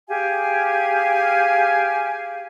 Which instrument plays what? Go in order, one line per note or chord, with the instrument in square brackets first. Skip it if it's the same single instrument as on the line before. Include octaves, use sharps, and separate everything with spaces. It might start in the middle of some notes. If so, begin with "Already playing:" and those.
[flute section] G4 G#4 F5 G#5